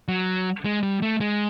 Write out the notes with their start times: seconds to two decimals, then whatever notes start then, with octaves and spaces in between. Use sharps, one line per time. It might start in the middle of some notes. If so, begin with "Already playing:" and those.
0.08 F#3
0.65 G#3
0.83 G3
1.02 A3
1.21 G#3